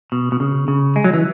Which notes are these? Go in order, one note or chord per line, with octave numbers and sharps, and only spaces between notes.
B2
B2
C#3
C#3
G#3
F#3
E3